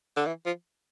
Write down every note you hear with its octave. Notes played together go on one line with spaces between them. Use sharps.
D3
E3
F3